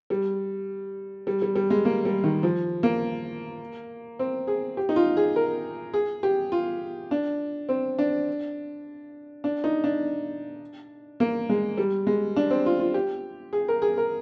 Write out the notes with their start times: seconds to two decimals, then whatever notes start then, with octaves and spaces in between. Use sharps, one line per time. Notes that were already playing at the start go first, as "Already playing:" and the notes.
0.10 G3
1.27 G3
1.42 G3
1.56 G3
1.70 G#3
1.85 A#3
2.05 G3
2.24 D#3
2.43 F3
2.83 A#3
4.19 C4
4.47 G#4
4.77 G4
4.89 D#4
4.96 F4
5.17 G#4
5.36 A#4
5.94 G#4
6.23 G4
6.52 F4
7.11 D4
7.69 C4
7.99 D4
9.44 D4
9.64 D#4
9.84 D4
11.20 A#3
11.49 G#3
11.77 G3
12.07 G#3
12.36 D4
12.50 C4
12.66 F4
12.80 F4
12.94 G4
13.53 G#4
13.68 A#4
13.82 G#4
13.97 A#4